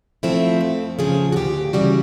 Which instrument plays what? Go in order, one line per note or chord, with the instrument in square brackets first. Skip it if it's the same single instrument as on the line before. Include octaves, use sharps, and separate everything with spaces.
[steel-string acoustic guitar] F3 A3 C4 E4
F2 A4
C#3 F3 G#4
F#4
D2 G4
C#3 E3 G3 F#4